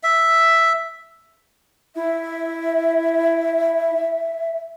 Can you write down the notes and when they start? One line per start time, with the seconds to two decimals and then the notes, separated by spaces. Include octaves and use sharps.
0.03 E5
1.96 E4 E5